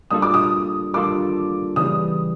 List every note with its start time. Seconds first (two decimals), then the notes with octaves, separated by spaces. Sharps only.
0.11 G3 A#3 D4 F4 A4 D#6
0.22 D6
0.34 D#6
0.94 G3 A#3 D4 F4 A4 D6
1.76 C#3 E3 G3 D#6